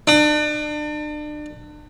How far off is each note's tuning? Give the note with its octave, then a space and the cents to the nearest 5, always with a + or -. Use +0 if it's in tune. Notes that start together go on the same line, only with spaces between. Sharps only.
D4 +35